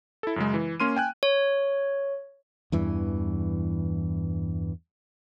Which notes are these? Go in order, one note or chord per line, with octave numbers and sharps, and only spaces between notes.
E4 A4
F#2 C#3 G#3
E3
A#3 C#4 C6 F6 D#7
G5 G#5 F#6
C#5
E2 G2 E3